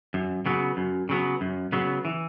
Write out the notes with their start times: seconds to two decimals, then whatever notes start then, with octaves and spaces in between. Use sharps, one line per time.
0.14 F#2
0.46 C#3 F#3 B3
0.77 F#2
1.09 C#3 F#3 B3
1.41 F#2
1.72 C#3 F#3 B3
2.05 E3